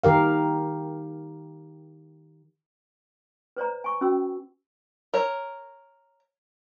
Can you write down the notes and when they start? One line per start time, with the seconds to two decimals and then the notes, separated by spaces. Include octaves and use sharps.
0.04 D#3 G4 A#4 F5
3.57 B4 C5 D5 A#5
3.84 G#5 C#6
4.01 C#4 F#4 G5 E6
5.14 A#4 C#5